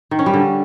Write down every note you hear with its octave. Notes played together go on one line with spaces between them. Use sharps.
D#3
C#4
G3
D3